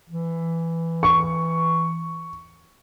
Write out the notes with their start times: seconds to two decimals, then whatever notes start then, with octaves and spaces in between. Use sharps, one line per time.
0.09 E3
1.03 C#6